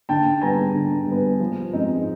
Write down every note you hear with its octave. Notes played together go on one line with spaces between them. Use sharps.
D3 G5 A5
G3 B3 G#5 A#5
D3
G3 B3
F3
G#3 C4 D#4